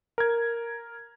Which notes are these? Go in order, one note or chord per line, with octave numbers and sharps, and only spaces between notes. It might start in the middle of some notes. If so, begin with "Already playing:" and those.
A#4 G#6